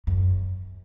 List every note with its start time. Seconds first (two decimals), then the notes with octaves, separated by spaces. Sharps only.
0.07 F#2